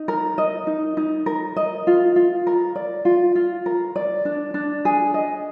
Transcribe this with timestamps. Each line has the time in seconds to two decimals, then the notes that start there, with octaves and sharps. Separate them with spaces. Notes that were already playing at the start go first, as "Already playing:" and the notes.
Already playing: D#4
0.08 A#4
0.38 D#5
0.67 D#4
0.97 D#4
1.26 A#4
1.56 D#5
1.87 F4
2.16 F4
2.47 A#4
2.75 D5
3.05 F4
3.35 F4
3.66 A#4
3.96 D5
4.25 D4
4.54 D4
4.85 G#4
5.14 D#5